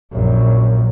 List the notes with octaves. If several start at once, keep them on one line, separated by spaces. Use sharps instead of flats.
A#1 F#2